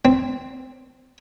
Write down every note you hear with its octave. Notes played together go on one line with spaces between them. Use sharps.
C4